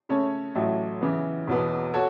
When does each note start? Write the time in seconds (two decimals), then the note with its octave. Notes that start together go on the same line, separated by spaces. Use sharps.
0.09 C#3 A3 C#4 A4 C#5
0.55 A1 A2 F#3 A3
1.01 C#3 E3 B3
1.47 E1 E2 B2 B3
1.94 F#4 A4 C#5